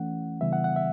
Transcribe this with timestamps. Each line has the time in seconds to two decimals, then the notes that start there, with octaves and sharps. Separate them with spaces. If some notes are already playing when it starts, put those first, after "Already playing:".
Already playing: E3 A3 C#4 F#5
0.41 C#3 E3 G3 B3 E5
0.53 F#5
0.64 F#5
0.76 E5